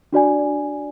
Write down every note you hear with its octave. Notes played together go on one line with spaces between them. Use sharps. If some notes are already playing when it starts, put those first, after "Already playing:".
D4 F#4 D5 G#5